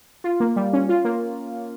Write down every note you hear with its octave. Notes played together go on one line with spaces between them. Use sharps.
F4
A#3
G3
C#4
F4
A#3